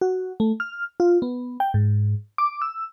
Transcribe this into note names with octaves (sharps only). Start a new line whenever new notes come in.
F#4
A3
F6
F4
B3
G5
G#2
D6
E6